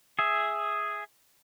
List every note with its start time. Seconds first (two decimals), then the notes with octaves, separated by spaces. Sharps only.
0.19 G#4 E5